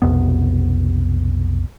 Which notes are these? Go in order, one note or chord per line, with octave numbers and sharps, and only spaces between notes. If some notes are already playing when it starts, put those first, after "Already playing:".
B1 F2 C3 B3